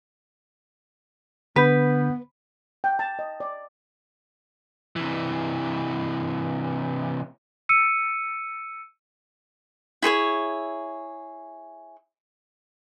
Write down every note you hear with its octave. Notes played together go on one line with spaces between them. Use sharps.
D3 B3 D4 B4 G6
G5
A5
D#5
D5
C3 E3
E6 C#7 D#7
E4 G#4 C5 C#5